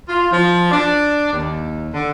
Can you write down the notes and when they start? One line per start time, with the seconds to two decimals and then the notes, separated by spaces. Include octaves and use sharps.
0.07 F4
0.31 F3
0.70 D4
1.32 D#2
1.93 D3